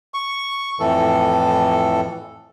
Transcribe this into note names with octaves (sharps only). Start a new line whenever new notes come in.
C#6
F2 A2 E3 A4